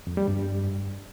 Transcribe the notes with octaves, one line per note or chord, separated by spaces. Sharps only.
F2
G3
G2